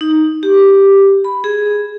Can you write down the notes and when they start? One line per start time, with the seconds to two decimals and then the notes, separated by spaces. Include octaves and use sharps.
0.01 D#4
0.43 G4
1.25 B5
1.44 G#4